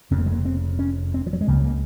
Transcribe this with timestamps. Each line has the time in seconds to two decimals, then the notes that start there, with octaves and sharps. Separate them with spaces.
0.11 F1 F2 C#3 C4
0.18 A#3
0.26 G#3
0.32 A#3
0.45 C4
0.79 C#4
1.14 C4
1.26 F3
1.33 F#3
1.41 G#3
1.47 C#2 C#3 A#3
1.64 A#3